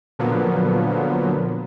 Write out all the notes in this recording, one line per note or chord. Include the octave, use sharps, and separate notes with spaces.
A#2 D3 F3 F#3 A#3 B3